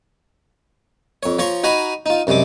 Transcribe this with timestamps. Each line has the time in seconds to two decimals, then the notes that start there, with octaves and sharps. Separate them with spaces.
1.23 F2 C#5
1.39 F3 C#5 A#5 C6 C#6
1.64 D#4 F#4 G#5 A#5 B5
2.06 D#4 F4
2.27 F#2 C3 G3 G#3 D6